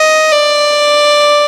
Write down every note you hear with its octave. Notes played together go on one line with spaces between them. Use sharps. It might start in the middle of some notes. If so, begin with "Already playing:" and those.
Already playing: D#5
D5